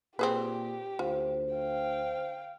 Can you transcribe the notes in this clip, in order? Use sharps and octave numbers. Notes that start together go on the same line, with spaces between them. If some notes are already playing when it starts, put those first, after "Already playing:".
A#2 C4 G4 G#4 B4
D2 F4 C5
F5 G5